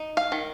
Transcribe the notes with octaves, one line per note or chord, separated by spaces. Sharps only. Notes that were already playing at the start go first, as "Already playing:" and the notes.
Already playing: D#4
F5
D#3